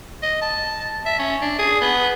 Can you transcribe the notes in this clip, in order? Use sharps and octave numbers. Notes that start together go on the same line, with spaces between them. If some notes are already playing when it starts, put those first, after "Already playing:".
D#5
A5
E5
C#4
D4
G#4
B3